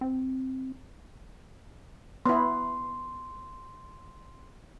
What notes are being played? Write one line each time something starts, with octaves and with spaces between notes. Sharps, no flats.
C4
B3 E4 C6